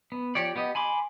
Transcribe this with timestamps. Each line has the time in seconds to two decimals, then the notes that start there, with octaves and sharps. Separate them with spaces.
0.12 B3
0.35 F3 G4 C#5 D5
0.56 B3 G4 D#5
0.75 G#5 B5 C6 D6